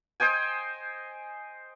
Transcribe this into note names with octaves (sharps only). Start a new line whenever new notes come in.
C5 D#5 G5 G#5